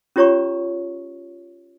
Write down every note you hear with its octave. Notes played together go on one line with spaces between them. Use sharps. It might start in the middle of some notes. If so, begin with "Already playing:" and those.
C#4 F4 G4 C#5 A#5 C#6